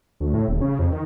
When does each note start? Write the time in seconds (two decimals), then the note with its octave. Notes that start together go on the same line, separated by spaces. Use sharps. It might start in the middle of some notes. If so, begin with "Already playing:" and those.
0.20 D2
0.34 A2
0.48 D#1
0.61 C#3
0.79 F2
0.92 D#3